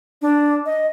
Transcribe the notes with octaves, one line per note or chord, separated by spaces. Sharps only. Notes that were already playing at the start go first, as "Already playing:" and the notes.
D4
D#5